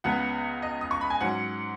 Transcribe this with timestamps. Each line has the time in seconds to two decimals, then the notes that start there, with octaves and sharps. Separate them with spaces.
0.04 C#2 C#3 B3 F#5
0.62 D#5
0.81 D#6
0.91 C#6
1.01 B5
1.10 G#5
1.21 G#2 F#3 C#4 F#5